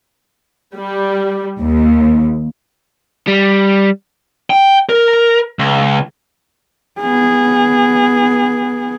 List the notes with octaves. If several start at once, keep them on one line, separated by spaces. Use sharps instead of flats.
G3
D#2
G3
G5
A#4
C#2
B3 G#4